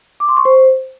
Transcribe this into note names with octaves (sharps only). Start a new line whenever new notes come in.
D6
C6
C#6
C5